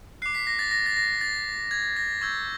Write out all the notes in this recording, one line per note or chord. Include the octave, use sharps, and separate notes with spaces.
D6 F#6 C7
B6
A#6
A6
A#6
A6
A#6
A6
G#6
A#6
C#6 E6 G6 G#6